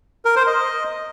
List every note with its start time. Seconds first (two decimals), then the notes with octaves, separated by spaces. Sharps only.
0.25 A#4
0.36 C5
0.47 D#5